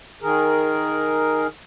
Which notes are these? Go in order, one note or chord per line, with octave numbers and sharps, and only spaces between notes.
D#3 G#4 A#4